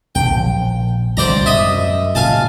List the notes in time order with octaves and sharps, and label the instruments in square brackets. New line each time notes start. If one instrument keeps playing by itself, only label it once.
[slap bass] B1 D3 [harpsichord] G5
[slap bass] A#1
[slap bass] C2 D3 [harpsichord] C5 D5 A#5
[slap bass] F#2 [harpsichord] D#5 E5
[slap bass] A#2 C#3 [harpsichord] F5 G#5 A5